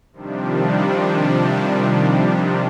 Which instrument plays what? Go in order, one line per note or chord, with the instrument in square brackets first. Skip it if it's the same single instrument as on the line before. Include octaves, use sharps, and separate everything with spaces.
[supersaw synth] C3 D#3 F3 G3 D4